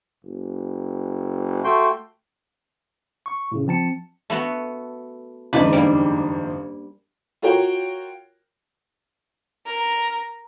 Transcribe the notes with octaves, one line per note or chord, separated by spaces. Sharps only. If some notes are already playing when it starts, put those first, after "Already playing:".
F#1
A3 F#4 G5 C6
C#6
A2 C#3
F3 C4 A5 C#7
A3 B3 F#4
F#1 F2 G#2 D#3 D4 B4
G3 A#3
F4 F#4 A#4 C#5 G5
A#4